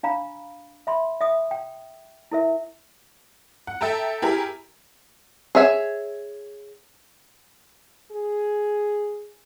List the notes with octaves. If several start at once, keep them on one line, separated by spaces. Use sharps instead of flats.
D4 F5 A#5 B5
E5 B5 C6
E5 D#6
G5
E4 A#4 E5
F#5
A4 E5 G5 A5 A#5
E4 G4 G#4 A#4
G#4 C#5 E5 F5 G#5
G#4